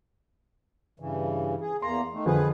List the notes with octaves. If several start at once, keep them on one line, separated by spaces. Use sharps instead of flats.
G2 C#3 E3
G#4
E2 A#3 A#5 C6
D#3 A3
F2 D3 F3 G#4 B4